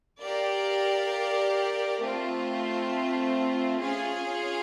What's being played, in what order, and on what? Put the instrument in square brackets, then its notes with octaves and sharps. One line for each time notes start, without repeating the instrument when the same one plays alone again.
[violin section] G4 A#4 D5 F5
A3 C4 F4
C#4 F4 G#4 C#5 F5